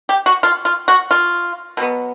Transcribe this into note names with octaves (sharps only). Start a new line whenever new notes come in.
G4
F#4
F4
F4
F#4
F4
B2 F#3 B3